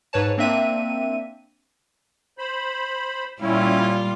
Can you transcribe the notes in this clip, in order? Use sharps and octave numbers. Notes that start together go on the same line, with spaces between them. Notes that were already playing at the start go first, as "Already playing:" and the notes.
G#2 B4 C#5 A5
A#3 C4 D4 E5 D#7
C5 B5
A#2 G3 C#4 E4 F4